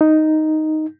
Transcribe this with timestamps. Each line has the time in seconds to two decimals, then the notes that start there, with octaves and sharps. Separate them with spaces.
0.01 D#4